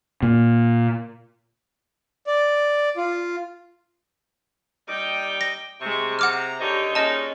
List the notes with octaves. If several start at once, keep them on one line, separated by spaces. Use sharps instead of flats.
A#2
D5
F4
G3 D#4 G5 D6
A#6
C3 G#3 C#6
F#5 A#5 D6 F6
D3 D#3 D#4 G4 C#5
A#2 G#3 C#4 D#4 D#5 A5